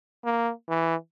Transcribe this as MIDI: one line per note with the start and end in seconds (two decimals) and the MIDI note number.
0.25 0.51 58
0.68 0.95 52